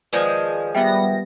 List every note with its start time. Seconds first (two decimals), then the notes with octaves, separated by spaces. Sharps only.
0.13 D#3 F3 G#3 B4 D5
0.75 G3 B3 E5 G5 A#6